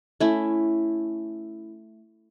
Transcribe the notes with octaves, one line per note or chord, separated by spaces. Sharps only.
A3 C#4 E4